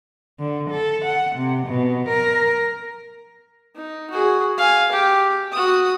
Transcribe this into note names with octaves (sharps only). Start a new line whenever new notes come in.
D3
A4
F#5
C3
B2
A#4
D#4
F#4 G#4
F5 G#5
G4
F#4 D#6